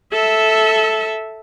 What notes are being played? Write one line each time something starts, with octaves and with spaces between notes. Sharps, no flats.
A4 E5